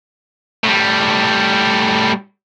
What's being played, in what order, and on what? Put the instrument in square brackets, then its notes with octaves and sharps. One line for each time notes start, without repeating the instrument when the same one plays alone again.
[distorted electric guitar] A2 G3